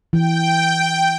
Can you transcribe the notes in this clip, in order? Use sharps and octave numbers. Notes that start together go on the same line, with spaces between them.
E3 G5